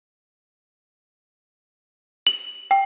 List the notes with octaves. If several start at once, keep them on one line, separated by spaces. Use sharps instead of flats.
F#7
G5